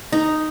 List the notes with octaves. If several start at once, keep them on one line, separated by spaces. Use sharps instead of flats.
D#4